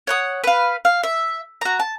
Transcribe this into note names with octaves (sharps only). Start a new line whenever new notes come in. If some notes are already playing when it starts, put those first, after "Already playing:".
C#5 F#5 D#6
B4 F5
F5
E5
F#4 A#5
A5